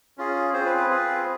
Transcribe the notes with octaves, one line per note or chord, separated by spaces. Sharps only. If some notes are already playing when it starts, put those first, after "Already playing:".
C#4 F4 G#4
C4 F4 G#4 C5
B4
B4
C4 F4 G#4